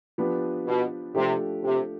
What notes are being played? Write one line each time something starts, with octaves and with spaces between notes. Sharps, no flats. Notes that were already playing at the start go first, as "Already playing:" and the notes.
F3 B3 D4 G4 B4
B2
C3 F3 A3 D4 G4
C3